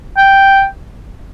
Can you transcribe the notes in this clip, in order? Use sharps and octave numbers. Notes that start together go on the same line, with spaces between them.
G5